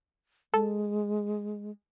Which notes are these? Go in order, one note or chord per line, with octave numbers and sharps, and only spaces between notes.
G#3 A4